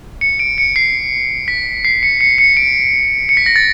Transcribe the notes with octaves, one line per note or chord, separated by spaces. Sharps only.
C#7
D7
C#7
C7
B6
C7
C#7
C#7
C#7
D7
C#7
B6
A#6
A6